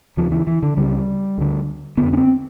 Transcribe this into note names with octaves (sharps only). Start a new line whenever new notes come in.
D#2 C#3 F3
E3
E3
D3
C#2 C#3 G3
D2 D3
F2 D3 B3
C#4
C4